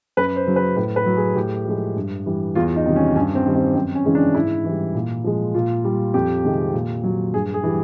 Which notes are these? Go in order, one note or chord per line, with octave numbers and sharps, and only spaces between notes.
F#2 B4
C5
C#3 F#3
B4
A2 B4
B4
F#3
G#4
A2 G4
F3 G#3
G2
E3 G3
E2 F4
D#4
C3 D#3 G3
C#4
G2 C#4
C4
D#3 G3
C4
F#2 C4
C#4
C#3 E3 G#3
D4
G#2 E4
E3 G3
A#2
F3 G#3
A#2 F4
G3
F2 G4
C3 D#3 G#3
A#2
F#3
G2 G#4
G#4
E3 G3